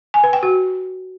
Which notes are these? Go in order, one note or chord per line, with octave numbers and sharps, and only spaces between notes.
G#5
B4
G5
F#4